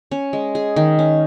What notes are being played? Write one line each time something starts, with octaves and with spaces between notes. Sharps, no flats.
C#4
G#3
G#4
D#3
C#4